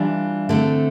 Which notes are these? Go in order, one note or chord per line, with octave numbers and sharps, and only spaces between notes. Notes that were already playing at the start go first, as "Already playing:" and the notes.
Already playing: E3 G3 D4 F4
D3 A3 C4